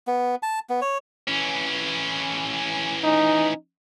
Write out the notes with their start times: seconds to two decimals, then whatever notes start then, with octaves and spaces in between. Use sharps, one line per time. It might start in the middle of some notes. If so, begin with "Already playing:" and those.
0.07 B3
0.43 A5
0.70 B3
0.82 C#5
1.27 E3 C#4
3.04 D#4